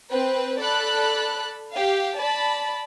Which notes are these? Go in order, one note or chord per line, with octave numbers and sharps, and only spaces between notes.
C4 B4
A4 D5 B5 F#6
G4 F5
D5 A5 B5